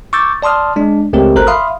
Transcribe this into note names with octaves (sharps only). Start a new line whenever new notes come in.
C#6 D6 E6 G6 A6
D5 A5 C6 D#6 F6
G#3 D4
C#2 A3 C4 G4 A#4
G#1 A4 A#4 C5 A#5 F#6
E5 F5 B5 C6 D#6 F6